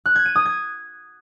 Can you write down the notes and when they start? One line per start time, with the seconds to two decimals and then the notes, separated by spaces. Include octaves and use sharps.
0.06 F#6
0.16 G#6
0.26 D#7
0.36 D#6
0.46 G#6